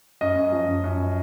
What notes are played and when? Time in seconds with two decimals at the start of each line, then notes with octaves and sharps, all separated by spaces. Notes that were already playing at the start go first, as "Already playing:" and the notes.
0.21 F#2 D#5
0.36 F#2
0.52 F3
0.68 F#2
0.84 F#2